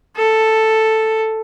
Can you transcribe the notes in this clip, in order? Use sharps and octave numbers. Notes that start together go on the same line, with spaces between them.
A4